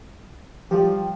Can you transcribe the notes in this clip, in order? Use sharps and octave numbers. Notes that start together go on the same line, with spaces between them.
F3 G3 F4 G4